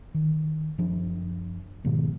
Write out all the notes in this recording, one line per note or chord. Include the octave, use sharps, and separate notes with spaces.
D#3
F#1 F3 D4
G#2 B2 D#3 F3